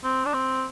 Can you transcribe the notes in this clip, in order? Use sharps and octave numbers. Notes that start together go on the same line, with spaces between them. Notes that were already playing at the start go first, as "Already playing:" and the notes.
C4
D4
C4